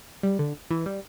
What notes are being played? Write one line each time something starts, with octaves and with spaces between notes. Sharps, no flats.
G3
D3
E3
G3